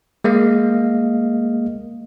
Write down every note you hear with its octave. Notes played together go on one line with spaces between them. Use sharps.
G#3 A#3 D#5 F5